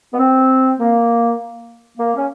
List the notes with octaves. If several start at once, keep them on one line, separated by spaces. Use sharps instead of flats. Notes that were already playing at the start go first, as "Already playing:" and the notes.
B3
C4
A#3
A#3
C#4